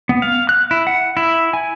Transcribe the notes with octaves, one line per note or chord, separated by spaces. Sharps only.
B3
F5
F#6
E4
F#5
E4
G#5